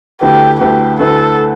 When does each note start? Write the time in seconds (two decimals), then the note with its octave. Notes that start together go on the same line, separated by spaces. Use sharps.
0.21 D2 D3 A3 E4 G4 B4
0.60 D2 D3 A3 E4 G4 B4
1.00 D2 D3 A3 E4 A4 B4